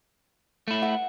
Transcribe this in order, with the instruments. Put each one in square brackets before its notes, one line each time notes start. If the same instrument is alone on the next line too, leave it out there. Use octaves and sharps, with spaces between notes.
[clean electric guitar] A3 E4
[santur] F#5